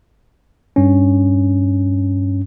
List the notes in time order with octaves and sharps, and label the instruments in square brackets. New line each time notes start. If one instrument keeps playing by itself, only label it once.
[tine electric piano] G2 C#4